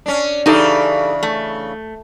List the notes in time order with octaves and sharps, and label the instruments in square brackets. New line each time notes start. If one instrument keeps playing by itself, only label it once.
[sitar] C#4 D4
[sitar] C#3 E3 D4 [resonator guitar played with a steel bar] D#4 G4 A4
[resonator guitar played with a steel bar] A3